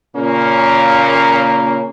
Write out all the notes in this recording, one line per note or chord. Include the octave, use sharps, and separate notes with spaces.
A#2 C#3 A#3 C#4